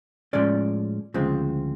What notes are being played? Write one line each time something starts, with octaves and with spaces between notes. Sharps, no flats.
A2 F3 G#3 C#4 D5
D2 C#3 F3 G#3 C4